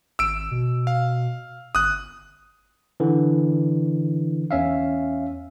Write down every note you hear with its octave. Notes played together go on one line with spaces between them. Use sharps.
G#1 E6 D7
B2
F5
G1 D#6 F#6
D3 E3
E2 C#4 E5 F5